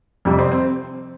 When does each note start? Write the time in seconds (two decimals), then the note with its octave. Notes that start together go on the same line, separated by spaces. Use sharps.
0.25 F2 C3 G3
0.39 C4
0.52 C4